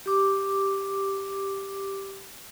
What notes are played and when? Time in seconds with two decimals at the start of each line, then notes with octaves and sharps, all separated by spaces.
0.06 G4 D6